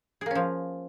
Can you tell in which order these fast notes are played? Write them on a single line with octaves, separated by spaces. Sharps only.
G#4 A#3 C#4 F3